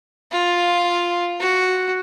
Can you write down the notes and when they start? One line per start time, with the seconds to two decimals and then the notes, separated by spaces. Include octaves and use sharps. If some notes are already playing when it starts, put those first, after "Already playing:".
0.32 F4
1.40 F#4